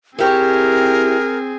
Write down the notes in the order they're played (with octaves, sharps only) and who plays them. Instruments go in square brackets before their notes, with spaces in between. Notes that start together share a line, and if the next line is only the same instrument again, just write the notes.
[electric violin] C4 G#4 [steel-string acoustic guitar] E4 G4 C#5 [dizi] A#4